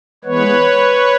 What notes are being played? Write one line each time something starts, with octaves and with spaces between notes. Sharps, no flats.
E3 G#3 B3 B4 C#5